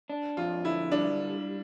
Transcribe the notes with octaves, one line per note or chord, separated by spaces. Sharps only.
D4
F2 F4
D3 E4
G3 D4